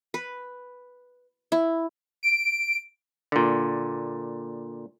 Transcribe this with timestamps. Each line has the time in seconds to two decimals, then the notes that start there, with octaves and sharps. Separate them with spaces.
0.14 B4
1.52 E4
2.23 D7
3.32 A#2 D3